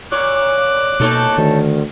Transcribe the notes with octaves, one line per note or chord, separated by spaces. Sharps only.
A#2 C#5 D6 F#6
B2 A#3 D#4 A4 C#5
D2 D#3